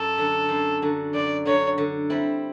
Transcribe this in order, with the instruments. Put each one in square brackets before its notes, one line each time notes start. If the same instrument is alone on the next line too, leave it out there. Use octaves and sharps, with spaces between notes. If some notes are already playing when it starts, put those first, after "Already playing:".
Already playing: [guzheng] F#2 [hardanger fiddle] A4
[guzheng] D3 F#3
F#2
D3 F#3
[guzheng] F#2 [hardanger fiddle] D5
[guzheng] D3 F#3 [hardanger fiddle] C#5
[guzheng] D3
G3 C4 E4